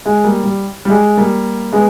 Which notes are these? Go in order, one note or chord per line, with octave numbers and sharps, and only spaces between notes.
G#3
G3 A#3
G3
G3
G#3
G3 A#3
G#3 B3